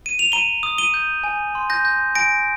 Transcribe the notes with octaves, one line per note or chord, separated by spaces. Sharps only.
D#7
F7
A#5 D#7 G7
D#6
D#7 G7
G6
G#5
C6
G6 A#6
G6
G#5 A#6 D7